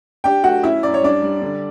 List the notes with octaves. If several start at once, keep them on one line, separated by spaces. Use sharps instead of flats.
D4 G4 G5
A3 F#4 F#5
C#4 E4 E5
F#2 D5
C#5
G3 D4 D5
G3
D3